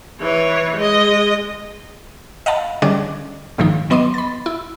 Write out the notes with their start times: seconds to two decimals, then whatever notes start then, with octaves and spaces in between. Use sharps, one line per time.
0.21 E3 C#5
0.76 G#3 D#5
2.46 D#5 F5 F#5 A5 B5
2.82 D3 G3 C#4 G#4 D#5 D6
3.58 A#1 G#2 D#3 F3 D#4
3.90 F#3 B3 D#5 C6 D6 D#7
4.14 B5 A6
4.46 E4